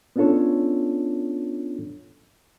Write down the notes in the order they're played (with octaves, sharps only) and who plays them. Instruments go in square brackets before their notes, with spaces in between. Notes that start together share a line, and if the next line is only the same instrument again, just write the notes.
[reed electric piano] B3 C#4 D4 F4 A4 C#5